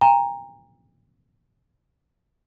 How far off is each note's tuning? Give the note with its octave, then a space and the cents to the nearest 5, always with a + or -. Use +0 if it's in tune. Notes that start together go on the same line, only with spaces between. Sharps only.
G5 +45 A#5 +0